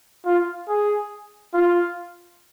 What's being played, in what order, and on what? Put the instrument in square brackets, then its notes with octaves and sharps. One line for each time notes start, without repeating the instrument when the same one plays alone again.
[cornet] F4
G#4
F4